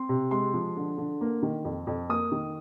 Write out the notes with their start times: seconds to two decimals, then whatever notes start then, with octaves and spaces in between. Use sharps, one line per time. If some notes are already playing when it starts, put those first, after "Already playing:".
Already playing: C4 C6
0.09 C3
0.31 G#3 C6
0.54 F3
0.77 D3
0.98 D3
1.21 A#3
1.43 D#3
1.65 F2
1.87 F2
2.09 A#3 D#6
2.32 D#3